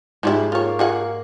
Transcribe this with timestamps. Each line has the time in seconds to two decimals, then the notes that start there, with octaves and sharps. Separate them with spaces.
0.23 G#2 F3 G3 E4 G#4
0.52 A#3 F4 C#5
0.79 F4 G#4 F#5